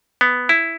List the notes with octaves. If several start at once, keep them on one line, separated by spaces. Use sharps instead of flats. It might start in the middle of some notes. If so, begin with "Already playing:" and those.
B3
E4